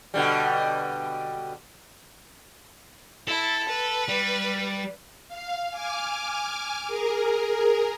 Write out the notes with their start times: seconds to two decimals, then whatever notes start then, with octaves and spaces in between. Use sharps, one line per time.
0.14 B2 D3 G3
3.28 E4 A4
3.69 B4
4.08 G3
5.28 F5
5.71 G#5 D6 F6
6.87 G#4 A#4